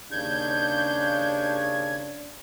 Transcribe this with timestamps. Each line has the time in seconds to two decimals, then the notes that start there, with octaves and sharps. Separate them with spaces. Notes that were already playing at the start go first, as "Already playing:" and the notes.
0.11 D#2 C#3 D4 G6 G#6